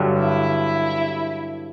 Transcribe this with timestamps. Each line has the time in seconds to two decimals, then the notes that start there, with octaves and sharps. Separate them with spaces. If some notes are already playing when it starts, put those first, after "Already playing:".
Already playing: G1 G2 D3 F#3
0.19 E4